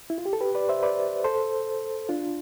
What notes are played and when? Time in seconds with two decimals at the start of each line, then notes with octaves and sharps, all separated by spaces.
0.10 E4
0.18 F4
0.26 G4
0.33 A4
0.41 G4 B4
0.55 B4 D5
0.69 C5 E5
0.83 B4 D5
1.24 A4 C5
2.09 D4 F4